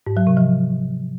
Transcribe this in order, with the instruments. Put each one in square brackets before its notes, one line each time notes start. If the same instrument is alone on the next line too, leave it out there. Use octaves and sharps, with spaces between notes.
[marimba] G#2
F#3
C3
F3